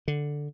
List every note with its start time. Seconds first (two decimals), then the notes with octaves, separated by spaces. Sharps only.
0.08 D3